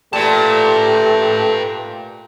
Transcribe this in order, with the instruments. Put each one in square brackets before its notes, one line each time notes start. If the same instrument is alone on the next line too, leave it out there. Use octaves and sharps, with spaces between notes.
[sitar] A#2 [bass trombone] A3 [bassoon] G4 [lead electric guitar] B4 A5